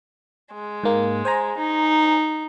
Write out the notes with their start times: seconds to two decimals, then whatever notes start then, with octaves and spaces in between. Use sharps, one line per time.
0.54 G#3
0.84 G#2 A#3
1.25 C5 G#5 A#5
1.58 D#4